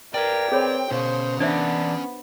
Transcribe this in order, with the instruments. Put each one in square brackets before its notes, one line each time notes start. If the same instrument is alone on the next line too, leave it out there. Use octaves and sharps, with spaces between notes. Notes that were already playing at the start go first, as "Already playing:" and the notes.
[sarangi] A#4 [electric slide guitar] B4 D5 [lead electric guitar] G5
[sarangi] C4 [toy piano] G#4 C#5 B5
[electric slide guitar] B2 [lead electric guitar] C#4 F5 [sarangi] C5
[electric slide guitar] E3 D5 A5 [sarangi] B3 [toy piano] D4 C5 E5